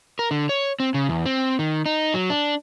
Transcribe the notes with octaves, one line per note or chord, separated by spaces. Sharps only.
A#4
D3
C#5
C4
C#3
E2
C4
D#3
D#4
F#3
D4